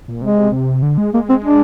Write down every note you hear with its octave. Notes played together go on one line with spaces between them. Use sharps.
A#2
C3 G#3
C3
D3
G#3
G#3 A#3
C4
D4